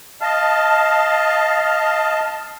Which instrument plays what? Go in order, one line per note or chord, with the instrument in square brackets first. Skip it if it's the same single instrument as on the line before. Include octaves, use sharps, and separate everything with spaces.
[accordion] D#5 A5 [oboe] F5